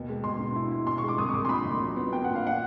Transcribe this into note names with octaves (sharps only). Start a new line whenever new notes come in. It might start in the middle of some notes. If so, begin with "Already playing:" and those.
Already playing: D#2 B2
G#3
B2 C6
B2
E4
E4
B2 C6
G#3 C#6
D6
C2 D#6
C#6
C2 D6
C6
A#2 B5
C2
F#3
B3
B3 G5
A#2 F#5
F5
F#5